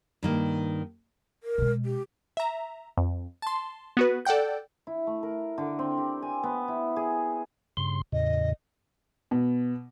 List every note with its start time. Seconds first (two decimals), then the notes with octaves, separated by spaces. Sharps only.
0.23 G2 D#3 A#3
1.43 A#4
1.58 B2 G#3
1.85 G4
2.37 E5 A#5
2.97 F2
3.42 A5 C6
3.97 B3 F#4 B4
4.25 A4 D5 F#5 G5 G6
4.87 E4
5.07 A3
5.23 A#4
5.58 D3
5.79 C4
5.97 G4
6.22 G#5
6.43 B3
6.68 E4
6.96 G#4
7.77 G2 C#3 C6
8.12 E2 A2 C#3 D#5
9.31 B2